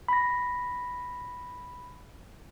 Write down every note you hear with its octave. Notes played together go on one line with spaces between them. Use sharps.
B5 A#6